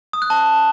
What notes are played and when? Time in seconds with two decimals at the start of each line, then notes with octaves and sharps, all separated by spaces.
0.13 D#6
0.22 F#6
0.30 A5